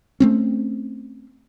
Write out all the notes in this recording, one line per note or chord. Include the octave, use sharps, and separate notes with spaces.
A3 C4 C#4